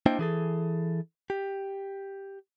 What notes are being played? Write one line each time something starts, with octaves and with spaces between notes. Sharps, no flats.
A#3 D4 E4 C5 D#5 G5
E3 G#4 A4
G4